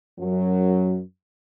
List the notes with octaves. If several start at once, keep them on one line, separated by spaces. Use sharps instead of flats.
F#2 F#3